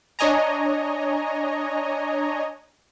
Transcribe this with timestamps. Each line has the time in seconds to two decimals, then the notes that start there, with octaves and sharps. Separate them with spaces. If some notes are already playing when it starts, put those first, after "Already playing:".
0.19 D4 C#5 D#5 G#5 A#5